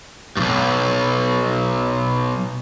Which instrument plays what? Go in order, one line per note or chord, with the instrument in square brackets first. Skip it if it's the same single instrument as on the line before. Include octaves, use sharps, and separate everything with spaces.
[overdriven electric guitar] B1 G2